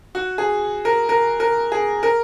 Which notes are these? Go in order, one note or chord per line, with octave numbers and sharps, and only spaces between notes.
F#4
G#4
A#4
A#4
A#4
G#4
A#4